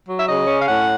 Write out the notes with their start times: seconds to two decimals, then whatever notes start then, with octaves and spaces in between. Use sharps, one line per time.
0.09 F#3
0.19 E5
0.28 C#3 D#5
0.47 C#4
0.59 F5
0.68 A2 F#5